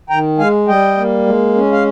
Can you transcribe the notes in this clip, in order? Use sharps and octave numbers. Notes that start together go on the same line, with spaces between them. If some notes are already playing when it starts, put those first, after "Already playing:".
D#3 G5 A#5
G#3 F5 G#5
G3 D#5 G5
A#3
G#3
C#4
F5